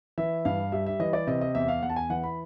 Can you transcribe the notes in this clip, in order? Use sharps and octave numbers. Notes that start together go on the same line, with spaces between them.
E3 E5
G2 F5
G3 E5
E5
E3 D#5
D5
C3 D#5
D#5
E2 E5
F5
E2 F#5
A5
G#5
E3 F#5
B5